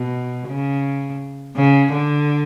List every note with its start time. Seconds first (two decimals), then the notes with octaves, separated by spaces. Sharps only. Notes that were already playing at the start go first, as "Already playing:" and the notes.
Already playing: B2
0.48 C#3
1.56 C#3
1.92 D3